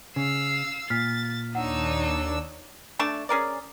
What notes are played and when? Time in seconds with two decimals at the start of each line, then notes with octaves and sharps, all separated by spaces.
0.16 C#3 F5 E6
0.90 A#2 F6 A6 B6
1.55 D#2 D4 D#4 C#5 F#5 E6
2.99 A3 D4 A5 C#6
3.29 C#4 G#4 A#4 D5